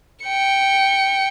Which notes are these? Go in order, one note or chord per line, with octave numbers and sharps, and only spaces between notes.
G5 C#7